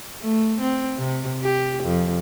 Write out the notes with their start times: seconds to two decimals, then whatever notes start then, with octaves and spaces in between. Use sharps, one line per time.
0.22 A3
0.61 C4
0.98 C3
1.43 G4
1.84 F2